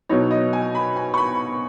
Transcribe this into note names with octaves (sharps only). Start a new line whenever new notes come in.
B2 F#3 D#4 C#5
D#5
G#5
B5
G#5
C#6
B5